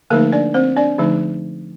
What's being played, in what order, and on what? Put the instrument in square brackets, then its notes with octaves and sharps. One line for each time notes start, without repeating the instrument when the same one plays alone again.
[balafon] D3 F3 A3 A#3 D#4 A#4
D4 D5
C4 C5
D4 D5
D3 F3 A3 D#4